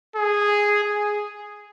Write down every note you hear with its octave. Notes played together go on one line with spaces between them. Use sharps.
G#4
G#4